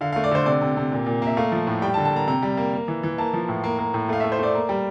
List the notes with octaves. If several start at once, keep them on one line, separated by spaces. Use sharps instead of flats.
D3 F5
A3 F5
D5
D3 C5
C3 D5
C3
C3
A#2
A#2
A#3 E5
A3 F5
F3
A2
G3 G5
A5
D3
A5
A#3 A#5
C3 A#5
G3
A#3
A#3
E3
E3
A#3 A5
F3
A2
A#3
A#3
A2
A3 F5
A3 E5
C5
A3 D5
A#3
G3